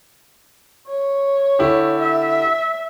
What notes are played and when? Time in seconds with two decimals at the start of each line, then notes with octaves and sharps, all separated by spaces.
0.87 C#5
1.59 D3 E4 G4
1.99 E5